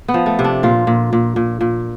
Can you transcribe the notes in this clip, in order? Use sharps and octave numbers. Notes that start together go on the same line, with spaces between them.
B3
F3
A3
C3
D4
A#2 F4
A#2
A#2
A#2
A#2